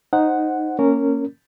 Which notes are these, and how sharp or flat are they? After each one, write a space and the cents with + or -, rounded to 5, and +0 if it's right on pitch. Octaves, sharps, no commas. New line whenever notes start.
D#4 -5 C5 +0 F#5 +0
A#3 +0 C#4 +0 A#4 -20